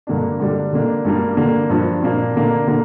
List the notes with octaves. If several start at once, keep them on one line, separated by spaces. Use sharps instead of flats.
G2 D3 A#3 D4
D3 G3 D4
D3 A#3 D4
G2 G3 A#3
D3 A#3 D4
G2 F3 D4
A#2 A#3 D4
D3 A#3 D4
D3 A#3 D4